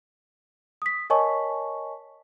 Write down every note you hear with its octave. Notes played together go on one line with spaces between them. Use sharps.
D#6 B6
A#4 C#5 D#5 G#5 A5 C#6